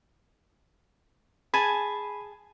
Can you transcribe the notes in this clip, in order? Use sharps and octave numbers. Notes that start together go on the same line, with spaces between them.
G#4 G#5 A5 B5